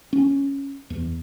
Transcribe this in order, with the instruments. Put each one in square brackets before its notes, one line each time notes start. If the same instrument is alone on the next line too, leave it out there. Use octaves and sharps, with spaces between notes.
[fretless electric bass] C#4
E2